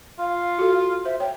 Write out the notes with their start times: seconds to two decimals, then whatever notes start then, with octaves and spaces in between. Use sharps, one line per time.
0.19 F4 F5
0.59 F#4 A4
1.05 C5 E5
1.20 C#5 G5